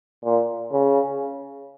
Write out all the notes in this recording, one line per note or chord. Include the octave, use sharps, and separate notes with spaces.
A#2
C#3